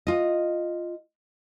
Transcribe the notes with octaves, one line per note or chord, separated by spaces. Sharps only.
F4 D#5